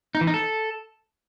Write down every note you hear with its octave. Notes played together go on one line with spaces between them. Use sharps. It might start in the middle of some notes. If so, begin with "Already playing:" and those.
D#4
E3
D#4
A4